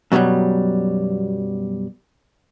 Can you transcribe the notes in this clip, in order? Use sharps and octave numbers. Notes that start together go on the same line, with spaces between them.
F#2 B2 E3 F#3 G3